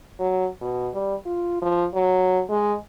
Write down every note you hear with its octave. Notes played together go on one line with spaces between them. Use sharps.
F#3
B2
G3
F4
F3
F#3
G#3